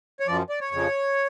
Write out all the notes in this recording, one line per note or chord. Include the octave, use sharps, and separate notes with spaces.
C#5
F#2 F3 D5
D5
C#5
F2 C#3 F3